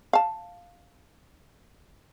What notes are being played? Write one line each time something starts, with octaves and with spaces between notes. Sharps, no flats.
F5 A5